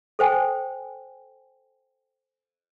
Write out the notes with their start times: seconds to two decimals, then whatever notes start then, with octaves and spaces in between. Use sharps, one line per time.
0.19 A4 C5 G5 G#5